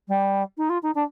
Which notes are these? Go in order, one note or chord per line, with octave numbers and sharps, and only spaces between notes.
G3
D#4
F4
D#4
D4